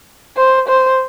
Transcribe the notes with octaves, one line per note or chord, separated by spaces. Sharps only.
C5
C5